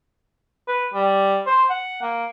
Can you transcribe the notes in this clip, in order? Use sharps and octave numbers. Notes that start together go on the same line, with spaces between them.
B4
G3
C5
F#5
A#3